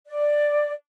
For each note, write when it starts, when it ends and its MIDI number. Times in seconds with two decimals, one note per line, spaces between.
0.06 0.73 74